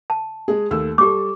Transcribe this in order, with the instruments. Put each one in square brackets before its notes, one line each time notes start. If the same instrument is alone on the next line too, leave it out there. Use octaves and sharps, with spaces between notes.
[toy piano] A5
[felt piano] G#3 G#4
D#2 A3 E6
[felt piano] G3 A4 [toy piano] G4 D6